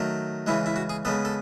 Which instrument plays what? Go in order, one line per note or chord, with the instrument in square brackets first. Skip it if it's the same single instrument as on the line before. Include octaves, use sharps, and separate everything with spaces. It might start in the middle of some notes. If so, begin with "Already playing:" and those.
Already playing: [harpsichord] D#3 F#3 A3
C#3 E3 G#3 E4
E4
F#4
G#4
C#3 G#3 B3 A4
A4